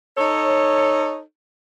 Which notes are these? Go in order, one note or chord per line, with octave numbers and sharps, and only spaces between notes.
D#4 A4 C#5